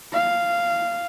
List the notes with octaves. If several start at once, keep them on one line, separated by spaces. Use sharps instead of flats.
F5